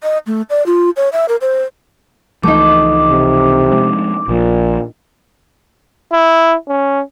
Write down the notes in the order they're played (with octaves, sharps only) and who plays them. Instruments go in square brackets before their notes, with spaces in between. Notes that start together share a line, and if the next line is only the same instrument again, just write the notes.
[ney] D#5
A3
D5
F4
C#5
E5
A#4
C5
[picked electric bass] C#2 E3 F3 [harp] A3 D#4 [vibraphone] D6
[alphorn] C3
[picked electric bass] F3 G#3 C4
[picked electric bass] A#1 F3 [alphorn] A#2
[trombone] E4
C#4